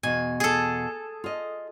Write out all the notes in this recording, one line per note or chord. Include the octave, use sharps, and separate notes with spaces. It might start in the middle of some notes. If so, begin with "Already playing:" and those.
E2 B2 G#5
G#4 A4
F4 D#5